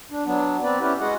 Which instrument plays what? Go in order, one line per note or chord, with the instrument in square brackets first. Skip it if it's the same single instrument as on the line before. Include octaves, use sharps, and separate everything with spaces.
[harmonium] D4
F#3 B3 D4
B3 C4 B4 D5
C#4 E4 G4 B4
G#3 F#4 G#4 D#5 F#5